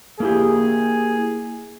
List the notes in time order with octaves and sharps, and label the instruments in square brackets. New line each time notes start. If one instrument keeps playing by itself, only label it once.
[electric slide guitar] A#3 E4 G4 [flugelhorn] G#4